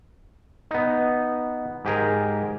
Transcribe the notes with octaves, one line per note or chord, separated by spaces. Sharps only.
B3 D#4
G#2 G4 G#4 A#4